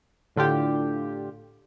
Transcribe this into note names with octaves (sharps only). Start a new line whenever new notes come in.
A2 D3 F4 G4